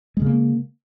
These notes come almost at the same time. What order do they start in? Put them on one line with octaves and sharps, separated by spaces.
G#3 C#3 A#3